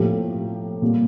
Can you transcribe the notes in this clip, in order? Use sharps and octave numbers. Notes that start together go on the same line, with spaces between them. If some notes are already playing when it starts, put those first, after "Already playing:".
Already playing: A2 F3 A#3 G4
A#2 G3 A#3